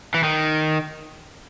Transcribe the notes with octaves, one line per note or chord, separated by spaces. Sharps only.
E3
D#3